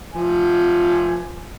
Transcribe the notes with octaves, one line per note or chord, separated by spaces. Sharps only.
F3 G#5